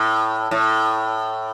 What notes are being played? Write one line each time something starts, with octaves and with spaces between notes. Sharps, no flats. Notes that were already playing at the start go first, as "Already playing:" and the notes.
Already playing: A2
A2